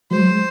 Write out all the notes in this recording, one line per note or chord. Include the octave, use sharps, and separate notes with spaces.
F#3 G#3 C5
G#3